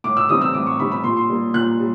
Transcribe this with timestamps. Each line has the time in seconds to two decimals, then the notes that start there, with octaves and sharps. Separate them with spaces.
0.04 A2 D6
0.17 E6
0.29 E3 G3 C4 D#6
0.41 E6
0.54 A2 D6
0.66 C#6
0.79 E3 G3 C4 B5
0.92 B5
1.04 A#2 C6
1.17 C6
1.29 G3 A#3
1.54 A#2 F#6
1.79 G3